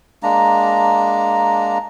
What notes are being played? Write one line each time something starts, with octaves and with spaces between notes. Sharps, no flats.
G#3 A#3 D4 A#5